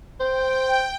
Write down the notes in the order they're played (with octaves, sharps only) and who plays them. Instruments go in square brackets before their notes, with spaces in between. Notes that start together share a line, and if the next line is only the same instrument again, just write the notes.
[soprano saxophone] C5 [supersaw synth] G5